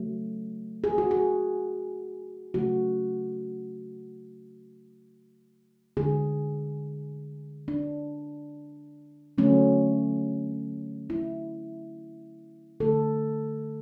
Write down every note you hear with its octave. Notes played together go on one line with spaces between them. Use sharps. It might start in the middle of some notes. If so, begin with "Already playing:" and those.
Already playing: C#3 F#3 A3
G#4
F#4
G#4
C#3 F#3 A3 F#4
D3 G#3 G#4
D4
D3 F#3 A3 C#4
E4
D3 A3 A4